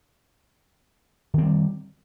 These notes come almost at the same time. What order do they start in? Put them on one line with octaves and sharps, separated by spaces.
D#3 C4 G3